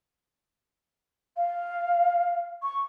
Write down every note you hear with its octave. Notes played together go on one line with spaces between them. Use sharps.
F5
C#6